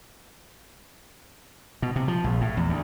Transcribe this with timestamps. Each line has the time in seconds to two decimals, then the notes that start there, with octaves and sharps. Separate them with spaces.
1.82 B2
1.96 C3
2.08 F3
2.24 A#1
2.41 A2
2.57 E2
2.69 D2